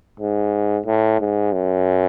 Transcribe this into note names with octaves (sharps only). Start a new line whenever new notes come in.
G#2
A2
G#2
F#2